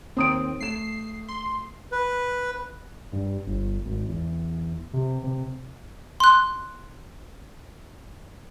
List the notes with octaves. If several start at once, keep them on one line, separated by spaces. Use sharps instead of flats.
D#2 C4 D#6 D7
A3 C7 E7
C6
B4
G2
G1
G#1
E2
C3
C3
C6 F#6